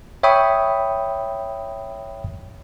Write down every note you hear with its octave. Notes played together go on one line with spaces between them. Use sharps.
C#5 E5 G5 B5 C#6 D#6